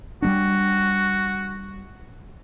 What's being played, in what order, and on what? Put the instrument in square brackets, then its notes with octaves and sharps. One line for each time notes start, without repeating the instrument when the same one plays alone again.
[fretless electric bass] G3 A3 D4 [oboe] F#4